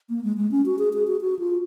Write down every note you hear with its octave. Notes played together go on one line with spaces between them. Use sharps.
A#3
G#3
G#3
C#4
F#4
G#4
G#4
F#4
F#4
F4